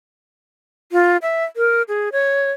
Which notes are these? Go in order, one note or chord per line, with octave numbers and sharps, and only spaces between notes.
F4
E5
A#4
G#4
C#5